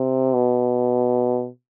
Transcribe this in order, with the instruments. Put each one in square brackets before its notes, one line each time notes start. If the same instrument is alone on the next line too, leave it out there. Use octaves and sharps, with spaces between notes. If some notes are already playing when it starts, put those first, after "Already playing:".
Already playing: [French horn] C3
B2